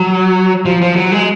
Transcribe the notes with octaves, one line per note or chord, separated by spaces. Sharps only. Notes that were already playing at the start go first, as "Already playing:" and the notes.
Already playing: F#3
F3
F3
F#3
G#3